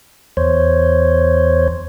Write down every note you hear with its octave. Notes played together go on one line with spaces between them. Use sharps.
E2 C5 C#5